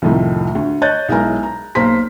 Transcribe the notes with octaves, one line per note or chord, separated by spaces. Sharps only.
C2 F2 A2 D#3 F3 A3
D2
C#5 D#5 F#6 G6 A6
B1 G#3 E4 A#4 G#5 A#5
A#5
B1 A#3 C5 A#5 C6 B6